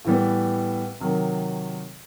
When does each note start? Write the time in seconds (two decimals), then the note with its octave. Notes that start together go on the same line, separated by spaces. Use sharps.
0.05 A2 E3 G3 B3
1.00 C3 D#3 F#3